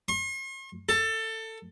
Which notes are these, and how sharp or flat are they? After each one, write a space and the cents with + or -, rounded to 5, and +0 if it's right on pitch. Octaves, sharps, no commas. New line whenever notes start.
C6 +45
A4 +20